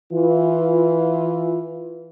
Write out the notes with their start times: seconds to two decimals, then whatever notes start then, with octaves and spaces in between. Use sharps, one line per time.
0.12 E3 F4